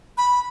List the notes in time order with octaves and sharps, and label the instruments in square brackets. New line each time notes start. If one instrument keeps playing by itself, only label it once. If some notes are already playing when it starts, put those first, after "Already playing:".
[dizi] B5